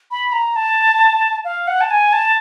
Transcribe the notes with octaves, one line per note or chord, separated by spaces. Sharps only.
B5
A#5
A5
F5
F#5
A5
G#5
A5